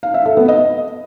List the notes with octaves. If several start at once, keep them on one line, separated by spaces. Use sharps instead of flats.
F5
E5
A4
B3
D#5